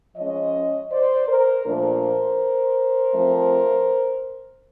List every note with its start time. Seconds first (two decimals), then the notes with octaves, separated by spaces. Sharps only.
0.16 F3 G#3 C#4 C#5 D#5
0.91 C5 D5
1.28 A#4 C5
1.65 A#2 F3 A3 D4 A#4 C5
3.14 F3 A3 C4